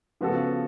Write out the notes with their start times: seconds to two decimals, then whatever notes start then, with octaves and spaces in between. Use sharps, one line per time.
0.21 C#3 F3 B3 F#4 A4